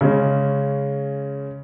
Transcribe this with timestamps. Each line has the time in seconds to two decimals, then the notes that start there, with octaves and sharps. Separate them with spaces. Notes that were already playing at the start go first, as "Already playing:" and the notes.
0.01 C#3 G#3 C#4